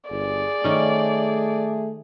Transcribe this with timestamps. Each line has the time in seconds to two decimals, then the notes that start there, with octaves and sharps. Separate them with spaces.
0.10 G1 G#4 D5
0.64 D#3 A3 C#4